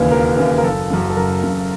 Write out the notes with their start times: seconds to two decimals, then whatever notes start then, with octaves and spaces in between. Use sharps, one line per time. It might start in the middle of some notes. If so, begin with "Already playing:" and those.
Already playing: E1 D#2 C#3 E3 B4
0.11 E1 A#4
0.37 D#2 C#3 E3
0.58 A#4
0.63 F#1 A4
0.90 F#2 C#3
1.10 A4
1.16 F#1 A#4
1.43 F#2 C#3